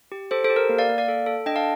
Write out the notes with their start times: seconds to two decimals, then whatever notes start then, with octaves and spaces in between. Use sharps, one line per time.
0.12 G4
0.31 G4 A4 C5
0.44 A4 C5
0.50 G4
0.56 A#4
0.69 A#3
0.78 D5 F5
0.89 A#3
0.98 D5 F5
1.08 A4
1.26 A4
1.46 D4 D#5 G5
1.56 F5 A5